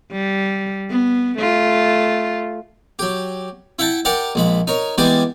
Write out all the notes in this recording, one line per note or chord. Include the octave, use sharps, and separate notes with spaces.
G3
B3
A3 F4
F#3 G4
E4 E5 F#5 G5 A5
G4 A#4 D5 F#5 G5
A#1 G#3 B5
D#4 A#4 C#5
E3 G3 G#3 B3 G4 D5